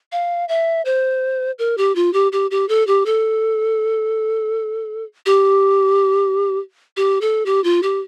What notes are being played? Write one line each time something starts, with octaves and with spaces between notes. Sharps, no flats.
F5
E5
C5
A#4
G4
F4
G4
G4
G4
A4
G4
A4
G4
G4
A4
G4
F4
G4